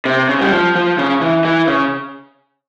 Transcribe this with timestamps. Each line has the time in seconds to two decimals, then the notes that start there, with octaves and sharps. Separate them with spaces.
0.05 C3
0.29 C#3
0.41 G3
0.52 F3
0.75 F3
0.98 C#3
1.22 E3
1.45 E3
1.68 C#3